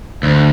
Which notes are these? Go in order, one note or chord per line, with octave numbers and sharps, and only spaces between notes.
D2